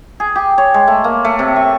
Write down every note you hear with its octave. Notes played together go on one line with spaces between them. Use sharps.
G#4
G4
C#5
G#3
A3
A#3
A3
C3
C#6